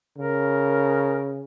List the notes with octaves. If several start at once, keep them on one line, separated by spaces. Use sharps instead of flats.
C#3 A#4